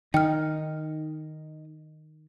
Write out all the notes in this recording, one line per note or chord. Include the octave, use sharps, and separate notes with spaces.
D#3 D#4 G5 F6